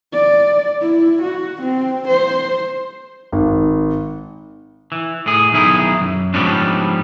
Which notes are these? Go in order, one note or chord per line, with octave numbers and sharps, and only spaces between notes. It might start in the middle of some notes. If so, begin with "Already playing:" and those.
D5
E4
F#4
C4
C5
G#1
E3
A2 G#4
B1 D#3 E4 G#4
F#2
G#2 F3 G3 B3 C#4 D4